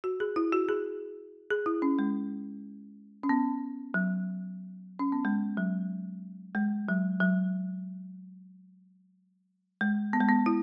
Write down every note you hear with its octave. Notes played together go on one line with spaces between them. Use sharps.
F#4
G#4
E4
F#4
G#4
G#4
E4
C#4
G#3
C#4
B3
F#3
C#4
B3
G#3
F#3
G#3
F#3
F#3
G#3
B3
G#3
B3
E4